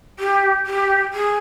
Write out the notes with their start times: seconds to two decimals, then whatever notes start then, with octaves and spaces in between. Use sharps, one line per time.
0.19 G4
0.66 G4
1.13 G#4